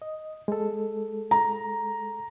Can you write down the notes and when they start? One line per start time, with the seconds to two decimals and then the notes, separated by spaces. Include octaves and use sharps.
0.02 D#5
0.48 G#3 A4
1.31 A#5